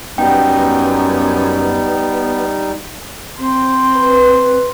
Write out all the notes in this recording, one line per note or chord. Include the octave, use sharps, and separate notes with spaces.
F#2 G3 B3 D#4 G5
C4 C5
B4